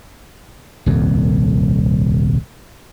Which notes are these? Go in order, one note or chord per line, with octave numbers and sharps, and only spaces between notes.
D#1 C2 F2